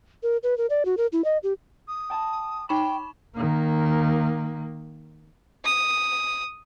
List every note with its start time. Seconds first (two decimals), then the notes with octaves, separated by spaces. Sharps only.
0.23 A#4
0.43 B4
0.58 A#4
0.70 D5
0.85 F#4
0.97 A#4
1.13 E4
1.24 D#5
1.43 G4
1.87 D#6
2.10 G5 A5
2.69 D#4 G5 B5 C#6 E7
3.35 D#3 A#3
5.65 D#6